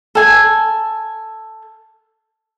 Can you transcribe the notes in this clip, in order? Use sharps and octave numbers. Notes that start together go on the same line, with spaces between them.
A4 G#5